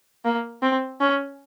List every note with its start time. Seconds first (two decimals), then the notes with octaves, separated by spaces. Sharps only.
0.25 A#3
0.62 C4
1.00 C#4